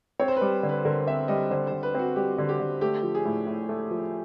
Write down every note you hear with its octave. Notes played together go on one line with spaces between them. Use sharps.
C4 C#5
C5
B4
G3
D3
B4
D3 A#4
C4 E5
G3 D#5
D3 C5
C5
D3
B4
C4 F#4
G3 G4
D3
G4
D3
A3 G4
F3
G#4
A2
A2
A3
F3